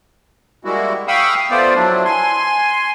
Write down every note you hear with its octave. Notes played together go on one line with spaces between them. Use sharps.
G3 G#3 A#3 E4 F#4
F5 G5 B5 C#6 D#6 E6
A3 B3 F4 C5 D5
F3 F#3 D4 E4
G#5 C6